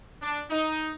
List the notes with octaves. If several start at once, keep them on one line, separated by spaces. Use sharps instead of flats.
D4
D#4